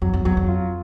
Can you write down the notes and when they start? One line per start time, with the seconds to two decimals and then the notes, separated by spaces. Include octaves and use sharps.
0.02 F2 F#3
0.13 F2
0.25 E2 F#3
0.37 F2
0.48 F4